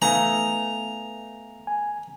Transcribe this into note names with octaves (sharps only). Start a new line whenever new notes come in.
A3 B3 D#4 F5 G#5 A#5
G#5